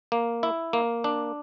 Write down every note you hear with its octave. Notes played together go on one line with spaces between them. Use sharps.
A#3
E4
A#3
D4